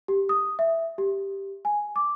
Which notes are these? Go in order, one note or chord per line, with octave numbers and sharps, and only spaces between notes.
G4
D#6
E5
G4
G#5
D6